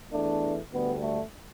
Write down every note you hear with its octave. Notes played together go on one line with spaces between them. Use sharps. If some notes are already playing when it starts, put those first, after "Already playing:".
E2 E3 A3 D4
D2 D3 G3 B3
A3